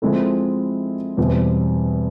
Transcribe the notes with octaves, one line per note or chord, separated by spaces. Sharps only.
F3 G#3 C4 E4 A4
E2 B2 G3 C4